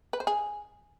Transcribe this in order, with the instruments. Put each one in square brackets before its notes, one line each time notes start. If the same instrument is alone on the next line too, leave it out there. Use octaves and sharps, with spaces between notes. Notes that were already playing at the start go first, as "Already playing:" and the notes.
[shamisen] B4
C5
G#4